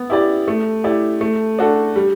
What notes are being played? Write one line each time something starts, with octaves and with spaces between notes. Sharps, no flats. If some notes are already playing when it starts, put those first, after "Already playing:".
Already playing: B3
E4 G4 D5
A3
E4 G4 D5
A3
D4 F#4 A4
G3